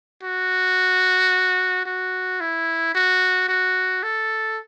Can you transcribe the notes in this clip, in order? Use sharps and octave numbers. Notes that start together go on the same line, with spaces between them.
F#4
F#4
E4
F#4
F#4
A4